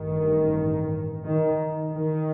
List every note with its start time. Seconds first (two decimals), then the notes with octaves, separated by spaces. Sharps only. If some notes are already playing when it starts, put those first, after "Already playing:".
Already playing: A1 G2 D#3
1.25 D#3
1.91 D#3